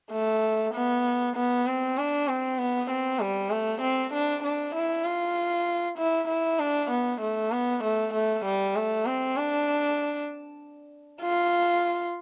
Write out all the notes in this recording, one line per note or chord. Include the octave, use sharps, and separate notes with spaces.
A3
B3
B3
C4
D4
C4
B3
C4
G3
A3
C4
D4
D4
E4
F4
E4
E4
D4
B3
A3
B3
A3
A3
G3
A3
C4
D4
F4